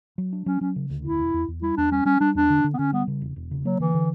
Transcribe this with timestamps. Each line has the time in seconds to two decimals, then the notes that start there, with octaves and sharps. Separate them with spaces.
0.18 F#3
0.33 D4
0.46 F#3 C#4
0.61 F#3 C#4
0.76 C#3
0.90 D2
1.05 E1 E4
1.19 E1
1.34 E2
1.48 E2
1.62 G3 E4
1.77 E2 D4
1.91 G3 C#4
2.05 G3 C#4
2.20 G3 D4
2.35 E2 D4
2.50 D3
2.64 D3
2.74 B3
2.78 D3 C#4
2.93 G3 B3
3.07 C#3
3.22 E1
3.36 E1
3.51 C#3
3.65 F#3 A#3
3.80 D3 E3
3.94 D3